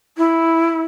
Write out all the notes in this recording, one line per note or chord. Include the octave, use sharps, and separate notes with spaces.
E4